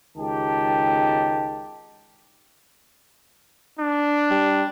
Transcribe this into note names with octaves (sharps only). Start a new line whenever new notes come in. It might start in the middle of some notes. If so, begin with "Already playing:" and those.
C#2 D#3 G4 A5
D4
G3